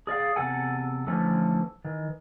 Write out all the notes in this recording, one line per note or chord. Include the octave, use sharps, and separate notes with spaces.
G#4 D5 D#5 F5
E2 C3 A4 F#5 G#5
D3 E3 F3 A3 C#4 A4
D#3 E3